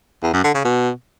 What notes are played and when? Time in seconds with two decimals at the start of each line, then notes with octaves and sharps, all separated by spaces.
0.23 E2
0.33 F#2
0.44 D3
0.54 C#3
0.65 B2